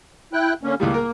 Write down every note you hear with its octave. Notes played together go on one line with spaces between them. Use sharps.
E4 G5 F#6
D3 A#3 C#4
C#2 A2 G3 A#3
A#4